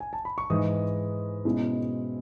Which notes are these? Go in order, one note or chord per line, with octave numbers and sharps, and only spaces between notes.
G#5
A5
B5
C#6
G#2 E3 G#3 D#4 D#5 D#6
B2 G#3 C#4 E4